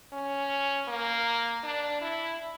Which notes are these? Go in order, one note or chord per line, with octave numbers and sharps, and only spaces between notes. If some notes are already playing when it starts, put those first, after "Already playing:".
C#4
A#3
D4
E4